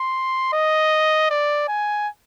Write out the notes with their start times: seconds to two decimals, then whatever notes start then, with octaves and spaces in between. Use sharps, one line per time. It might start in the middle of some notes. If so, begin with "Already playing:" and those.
Already playing: C6
0.53 D#5
1.30 D5
1.68 G#5